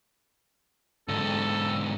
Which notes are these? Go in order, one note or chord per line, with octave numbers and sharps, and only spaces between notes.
G#2 D3 A4